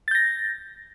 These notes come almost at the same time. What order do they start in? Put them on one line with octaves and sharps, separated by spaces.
A6 G6 A#6